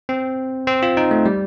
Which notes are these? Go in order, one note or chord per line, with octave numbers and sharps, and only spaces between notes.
C4
C4
F4
D#4
A3
G3